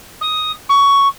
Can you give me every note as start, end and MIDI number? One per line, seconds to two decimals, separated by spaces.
0.21 0.52 87
0.69 1.08 85